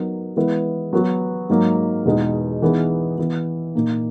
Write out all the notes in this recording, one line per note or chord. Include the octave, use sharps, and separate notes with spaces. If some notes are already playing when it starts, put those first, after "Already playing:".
Already playing: F#3 B3 D#4 A#4
E3 G#3 B3 E4 B4
F#3 B3 F#4
G#2 F#3 A#3
E2 B2 G#3 D#4
E3 B3 D#4 G#4 B4
E3 B3 E4
A#2 A#3 D#4